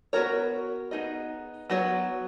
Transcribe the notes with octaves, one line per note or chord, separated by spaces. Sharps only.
B3 F#4 A#4 C#5
B3 D#4 G#4 D#5
F#3 B3 F#4 C#5